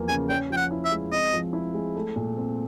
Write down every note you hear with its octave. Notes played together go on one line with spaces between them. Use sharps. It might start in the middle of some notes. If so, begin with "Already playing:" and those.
Already playing: E2 F3 A#3
C#3 G#5
C#4 G5
F3 G5
F#5
E4
E5
G#3
C4 D#5
F3
E4
G#3
A3
A#2
C4